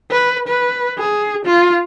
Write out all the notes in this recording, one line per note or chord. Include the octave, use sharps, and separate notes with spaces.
B4
B4
G#4
F4